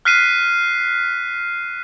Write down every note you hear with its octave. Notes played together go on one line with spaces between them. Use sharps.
F6 F#6 B6 C7 D#7